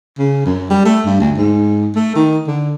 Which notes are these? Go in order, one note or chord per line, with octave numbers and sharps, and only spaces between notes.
C#3
F#2
G3
A3
G2
D2
G#2
A3
D#3
D3